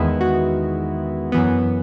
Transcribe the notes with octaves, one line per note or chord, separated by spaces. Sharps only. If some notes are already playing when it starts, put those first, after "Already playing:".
Already playing: E2 D#3 G#3 B3 E4
F#4
F#2 E3 B3